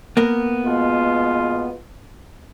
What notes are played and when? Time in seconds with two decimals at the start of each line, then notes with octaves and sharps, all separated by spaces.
0.17 A#3 B3 A#4
0.66 B2 G#3 F4